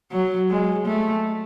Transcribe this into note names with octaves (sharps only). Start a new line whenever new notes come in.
F#3
G#3
A3